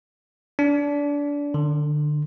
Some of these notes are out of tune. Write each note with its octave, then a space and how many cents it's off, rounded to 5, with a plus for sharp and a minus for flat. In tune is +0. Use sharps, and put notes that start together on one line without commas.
D4 -25
D3 +25